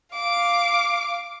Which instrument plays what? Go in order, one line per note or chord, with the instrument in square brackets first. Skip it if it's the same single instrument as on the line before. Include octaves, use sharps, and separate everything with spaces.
[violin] F5 D6